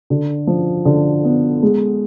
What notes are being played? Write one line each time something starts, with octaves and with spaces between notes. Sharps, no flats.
D3
F3
D3
B3
G#3